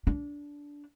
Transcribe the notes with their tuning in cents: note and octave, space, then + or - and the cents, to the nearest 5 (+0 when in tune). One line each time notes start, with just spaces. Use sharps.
D4 -15